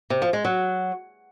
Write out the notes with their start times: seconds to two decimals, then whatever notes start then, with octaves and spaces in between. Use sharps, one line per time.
0.10 C3
0.22 F3
0.33 G#3
0.45 F#3